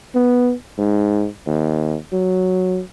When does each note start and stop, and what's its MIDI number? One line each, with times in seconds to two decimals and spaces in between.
0.15 0.53 59
0.78 1.27 44
1.47 1.97 39
2.13 2.82 54